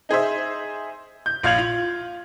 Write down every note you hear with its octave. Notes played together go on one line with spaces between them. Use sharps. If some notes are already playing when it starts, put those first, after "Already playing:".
D#4 G#4 C5 E5
G6
A#1 F5 F6 G#6 F7 F#7
F4